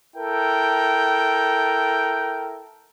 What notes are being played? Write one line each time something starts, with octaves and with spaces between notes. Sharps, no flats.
E4 A4 A#4 G5